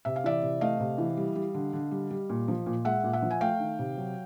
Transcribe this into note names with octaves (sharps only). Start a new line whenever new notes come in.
C3 E5
F5
E3 D5 E5
C3
A3 D#5 F5
C3
E3
G3
G3
D3
D3
G3
G3
A#2
F3
A#2
G#3 E5 F#5
A#2
E5 F#5
F3
G#5
A3 F5 G5
D#3
C3
F#3